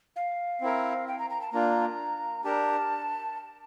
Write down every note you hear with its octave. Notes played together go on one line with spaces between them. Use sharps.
F5
C4 E4 A#4
G5
A#5
A#5
A5
A#3 D4 F4 A#5
D4 G4 A#4 A5